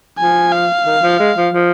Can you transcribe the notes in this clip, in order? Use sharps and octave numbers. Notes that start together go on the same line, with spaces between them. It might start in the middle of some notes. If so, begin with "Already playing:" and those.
F3 G#5
F5
D#3
F3
G#3
F3
F3